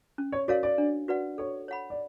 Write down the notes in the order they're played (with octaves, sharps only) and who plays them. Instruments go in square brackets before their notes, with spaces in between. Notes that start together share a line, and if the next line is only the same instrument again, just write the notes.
[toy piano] C#4
[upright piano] C#5
[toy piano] F#4 A#4 C#5 F5 [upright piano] D5
[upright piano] D5
[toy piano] D4
F#4 B4 D5 F#5
[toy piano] A4 [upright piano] C#5
[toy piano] C#5 F#5 B5
[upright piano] D5